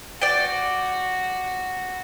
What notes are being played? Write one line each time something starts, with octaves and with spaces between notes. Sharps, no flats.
F#4 D5 G5